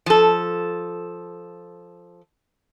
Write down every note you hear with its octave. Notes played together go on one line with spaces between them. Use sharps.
F3 A4